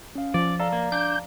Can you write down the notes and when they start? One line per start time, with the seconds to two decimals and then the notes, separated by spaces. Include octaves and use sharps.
0.15 C#4 F5
0.34 F3 D5
0.60 A4 D5 F5 A#5
0.73 A#3
0.92 D4 G6